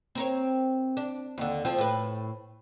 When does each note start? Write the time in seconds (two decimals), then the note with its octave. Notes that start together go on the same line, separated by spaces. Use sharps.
0.15 C4 A#4 C#5
0.97 D4
1.38 D#2 D3
1.65 F3 C4 F4
1.78 A2 B4